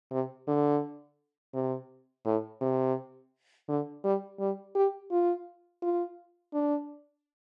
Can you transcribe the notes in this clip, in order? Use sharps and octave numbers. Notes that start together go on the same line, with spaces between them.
C3
D3
C3
A2
C3
D3
G3
G3
G4
F4
F4
D4